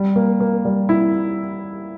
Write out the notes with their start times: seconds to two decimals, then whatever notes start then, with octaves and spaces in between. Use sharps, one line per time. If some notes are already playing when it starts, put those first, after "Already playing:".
Already playing: G3
0.16 A#3
0.40 A#3
0.65 G3
0.89 E4